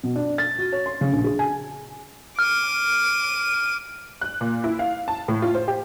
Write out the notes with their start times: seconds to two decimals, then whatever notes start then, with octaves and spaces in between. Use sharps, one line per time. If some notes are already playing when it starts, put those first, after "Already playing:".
0.04 B2
0.16 D4
0.38 A6
0.58 F#4
0.72 C#5
0.86 C6
1.01 C#3
1.13 A#1
1.24 G#4
1.39 G#5
2.39 D6 F6 D#7
4.21 F#6
4.41 A#2
4.64 E4
4.79 F5
5.08 A5
5.28 A2
5.42 F4
5.55 C5
5.68 G4